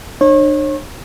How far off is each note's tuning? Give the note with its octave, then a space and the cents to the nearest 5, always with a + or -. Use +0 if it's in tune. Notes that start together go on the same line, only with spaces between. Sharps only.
D4 +40 C#5 -35